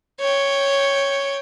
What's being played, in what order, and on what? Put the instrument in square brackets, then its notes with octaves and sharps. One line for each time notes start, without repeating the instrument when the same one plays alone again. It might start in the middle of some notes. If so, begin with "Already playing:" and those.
[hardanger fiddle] C#5 G5